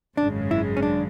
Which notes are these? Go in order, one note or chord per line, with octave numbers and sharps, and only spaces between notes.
G#1 F#2 C#3 G#3 D4
E4
C#4
D4